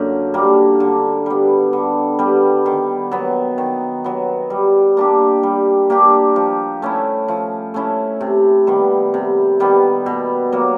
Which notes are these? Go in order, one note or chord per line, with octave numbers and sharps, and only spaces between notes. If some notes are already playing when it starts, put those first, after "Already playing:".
Already playing: F#2 D3 A#3
D3 G3 A#3
D3
G3 B3
D3
G3 B3
D#3
F#3 B3
D#3
F#3 B3
G3
A#3 D4 G4
G3
A#3 D4 G4
F3
A3 C#4 E4
F3
A3 C#4 E4
C3
D#3 G3 B3
C3
D#3 G3 B3
B2
F#3 A#3